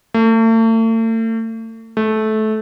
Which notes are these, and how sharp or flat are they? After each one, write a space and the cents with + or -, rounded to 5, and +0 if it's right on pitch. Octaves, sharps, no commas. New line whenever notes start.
A3 +40
A3 -20